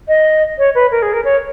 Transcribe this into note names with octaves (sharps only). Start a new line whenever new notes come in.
D#5
C#5
B4
A#4
G#4
A#4
C#5